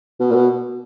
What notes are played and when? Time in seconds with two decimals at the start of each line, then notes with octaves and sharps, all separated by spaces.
0.20 B2
0.31 A#2
0.35 B2